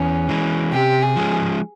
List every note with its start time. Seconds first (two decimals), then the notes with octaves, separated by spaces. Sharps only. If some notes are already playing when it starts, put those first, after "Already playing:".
Already playing: E2 C#4
0.29 E3 G#3
0.72 C3 G4
1.02 G#4
1.16 F3 G#3 C#4